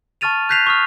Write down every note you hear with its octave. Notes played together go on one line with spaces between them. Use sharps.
A5 C#6 F6 A6 D#7 F7
F#6 G6 B6 C7 F7
C#6 D#6 F6